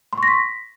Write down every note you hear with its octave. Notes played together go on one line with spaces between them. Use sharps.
C6
C#6
A#6
B6